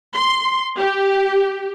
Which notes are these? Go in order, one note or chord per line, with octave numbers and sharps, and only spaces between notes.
C6
G4